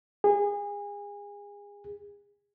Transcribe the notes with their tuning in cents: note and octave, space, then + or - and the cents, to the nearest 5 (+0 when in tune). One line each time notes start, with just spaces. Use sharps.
G#4 -30